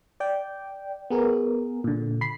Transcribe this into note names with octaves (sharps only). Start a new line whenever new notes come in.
D5 G5
B3 G#4 A#4
A#2 D3
B5 C7